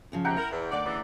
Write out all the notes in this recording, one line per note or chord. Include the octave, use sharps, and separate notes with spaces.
E2 C#3 F3
G#2 C3 F#5 G5 A#5
E4 A#4
E2
D2 D3 D#3 D5 F#5
C#3 E3 D5